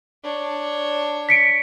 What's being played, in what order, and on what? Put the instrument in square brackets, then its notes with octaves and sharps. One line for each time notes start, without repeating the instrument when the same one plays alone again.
[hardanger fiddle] D4 C#5
[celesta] B6 C#7 D7